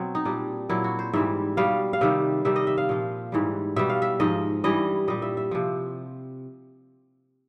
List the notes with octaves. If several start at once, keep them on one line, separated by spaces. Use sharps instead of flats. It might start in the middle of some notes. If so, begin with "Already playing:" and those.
Already playing: B2 F#3 C4
D#4
A#2 G3 D4
A#2 F#3 E4
F#4
C5
G#2 E3 G3 E5
B2 G3 F5
F5
C3 D#3 G3 E5
C3 D#3 G3 E5
D#5
E5
F5
A#2 F3
G#2 E3 G3
B2 G3 E5
F5
E5
G#2 F3 D#5
G2 E3 G3 D#5
A#2 G3 D#5
E5
E5
C3 F3